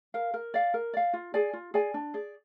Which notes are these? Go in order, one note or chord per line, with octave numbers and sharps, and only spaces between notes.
A#4 F5
A#4
D5 F5
A#4
D5 F5
F4
G#4 D5 G#5
F4
G#4 D5 G#5
D4
G#4 D5